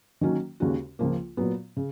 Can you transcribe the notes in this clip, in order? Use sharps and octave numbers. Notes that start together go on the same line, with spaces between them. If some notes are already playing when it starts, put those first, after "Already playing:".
D#3 F#3 A#3 C#4 F#4
D#2 C#3 G#3 C#4 F#4
C#2 C#3 F3 A#3
A#2 F#3 B3
C#3